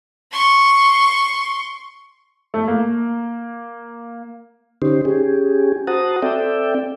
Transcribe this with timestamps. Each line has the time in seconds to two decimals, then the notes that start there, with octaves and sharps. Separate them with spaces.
0.31 C6 C#6
2.54 A3
2.68 A#3
4.82 D3 C#4 D#4 G4 C5
5.05 C#4 G4 G#4
5.87 F#4 C5 F#5 A5 A#5 D#6
6.22 C4 A4 D5 E5 G5